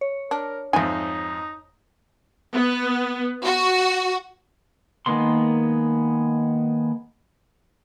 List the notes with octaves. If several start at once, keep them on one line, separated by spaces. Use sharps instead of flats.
C#5
D4 A#4
F2 G#2 D#4 E5 G#5
B3
F#4
D#3 G#3 A#3 B3 C6